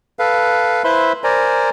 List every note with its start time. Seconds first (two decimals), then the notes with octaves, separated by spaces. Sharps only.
0.19 A4 B4 F5
0.84 E4 B4 C5 E5 B5 C6
1.24 A#4 C5 D5 G#5 A#5